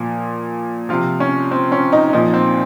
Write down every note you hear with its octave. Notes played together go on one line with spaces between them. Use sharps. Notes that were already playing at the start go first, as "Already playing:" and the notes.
Already playing: A#2 F3
C3 F3 F4
C#4
C4
C#4
D#4
A#2 F3 D#4
C4